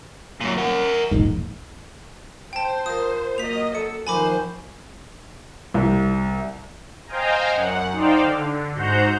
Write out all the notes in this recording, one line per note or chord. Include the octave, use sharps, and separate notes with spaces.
F#2 A#2
A#4 F#5
E1 A#1 G#2
C5 G5 A5
F4 A#4 D#6
F#3 A#3 D#5 B6 F7
A4 C#7
F2 D#3 C5 G#5 B5 C#6 D6
C2
C5 D#5 F5 G5 G#5 A#5
F#2 F#5
D#4 C5 D5 F5 G5
D3
G#2 F#4 C5 F#5 A#5 G6